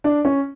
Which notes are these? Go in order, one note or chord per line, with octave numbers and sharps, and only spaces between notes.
D4
C#4